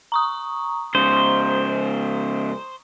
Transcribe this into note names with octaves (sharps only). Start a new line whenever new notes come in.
A#5 C#6 D#6
G#2 C#3 C5